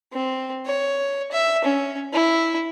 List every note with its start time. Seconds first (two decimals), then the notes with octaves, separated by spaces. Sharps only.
0.13 C4
0.66 C#5
1.32 E5
1.65 C#4
2.13 E4